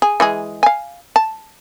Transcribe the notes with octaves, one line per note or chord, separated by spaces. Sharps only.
G#4
E3 G#3 G#4
F5 G#5
A5